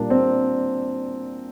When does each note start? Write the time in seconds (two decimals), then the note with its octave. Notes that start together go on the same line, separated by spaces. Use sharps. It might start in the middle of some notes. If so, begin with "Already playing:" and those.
Already playing: A#2 G3 A#3 D4
0.10 C4